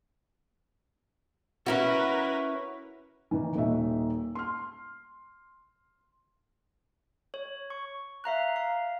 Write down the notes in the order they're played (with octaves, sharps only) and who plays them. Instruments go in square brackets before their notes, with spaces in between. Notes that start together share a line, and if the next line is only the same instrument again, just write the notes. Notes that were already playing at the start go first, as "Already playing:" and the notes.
[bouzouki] C#4 E4 F#4 [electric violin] A#4 B4
[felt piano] D#3 E3
D#1 A#2 D#3 D#4 F#4 E5
C6 F6
[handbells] C#5
C#6
E5 F5 A#5 F#6
F5